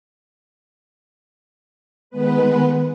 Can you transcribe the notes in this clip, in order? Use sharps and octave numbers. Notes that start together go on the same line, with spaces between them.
D#3 G#3 B3 B4